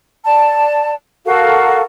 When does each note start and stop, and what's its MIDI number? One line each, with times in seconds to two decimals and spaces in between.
0.25 0.92 74
0.25 0.92 81
1.25 1.81 66
1.25 1.81 69
1.25 1.81 70
1.25 1.81 77